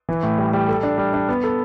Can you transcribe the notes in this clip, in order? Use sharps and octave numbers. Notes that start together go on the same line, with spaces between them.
E3
A2
G3
G3
A4
D4
G3
D4
B3
A4